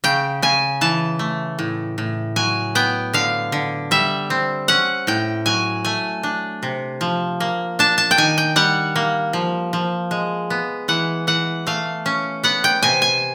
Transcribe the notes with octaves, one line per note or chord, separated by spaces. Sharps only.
C#3 G5
C#3 G#5
E3 A5
A3
A2
A2
F#3 G#5
B3 G5
D3 F5
D3
G3 E5
C4
C#4 F#5
A2 G5
F#3 G#5
A3 G#5
D4
C3
F3
A#3
D4 A5
A5
G5
D#3 G#5
G5
G3 F#5
A#3
F3
F3
G#3
B3
E3 F#5
E3 F#5
A3 F5
C#4
B3 F#5
G5
C3 G#5
G#5